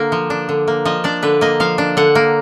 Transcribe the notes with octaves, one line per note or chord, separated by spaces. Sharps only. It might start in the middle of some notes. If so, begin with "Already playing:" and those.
Already playing: D3 A#3 D4 F5
F3
D4
D3
A#3
F3 D#5
D4 D5
D3 B4
A#3 D#5
F3 F5
D4
D3 F#5
A#3